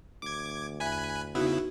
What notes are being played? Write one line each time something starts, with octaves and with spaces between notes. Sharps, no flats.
D2 D6 G#6
E2 E5 G#5 B5 F#6
C#3 B3 D#4 E4 F#4